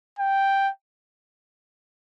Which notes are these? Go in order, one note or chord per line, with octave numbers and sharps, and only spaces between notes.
G5